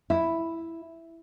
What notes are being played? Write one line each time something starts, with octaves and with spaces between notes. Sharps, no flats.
E4